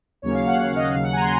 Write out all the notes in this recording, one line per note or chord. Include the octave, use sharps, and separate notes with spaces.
D#2 C#3 F#3 A#3 C#4 C#5
F5
F#5
F#5
D#5
D#2 C#3 F#3 F5
F#5
G#5 A#5
C6